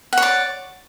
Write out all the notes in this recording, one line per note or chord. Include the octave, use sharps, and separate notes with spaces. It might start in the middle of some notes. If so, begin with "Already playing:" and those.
C#5 D5 F#5